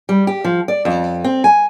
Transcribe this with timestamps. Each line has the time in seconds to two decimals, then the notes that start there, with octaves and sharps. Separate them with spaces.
0.09 G3
0.27 G4
0.44 F3
0.68 D5
0.85 F2
1.24 C4
1.44 G#5